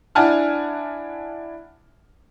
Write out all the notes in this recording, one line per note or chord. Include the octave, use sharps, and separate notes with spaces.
D4 E4 F#5 G#5 A5 F6